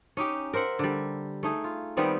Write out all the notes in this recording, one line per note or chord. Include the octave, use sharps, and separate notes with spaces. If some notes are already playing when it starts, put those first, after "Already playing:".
C#4 D#4 G4
A#4 C5 E5 F#5
D3 G3
A3 D#4 G#4
F4
D#3 G3 B3 C4